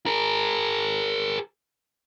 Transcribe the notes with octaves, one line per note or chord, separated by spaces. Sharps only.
G#4 A#4